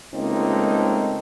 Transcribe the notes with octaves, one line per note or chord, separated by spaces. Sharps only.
C#2 A3 A#3 C4 D#4